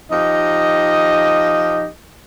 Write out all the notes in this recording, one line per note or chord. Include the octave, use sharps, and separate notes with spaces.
F3 D#4 G4 D#5